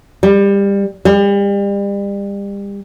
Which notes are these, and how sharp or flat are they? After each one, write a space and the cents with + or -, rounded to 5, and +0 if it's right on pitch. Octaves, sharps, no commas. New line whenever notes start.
G3 +25
G3 +35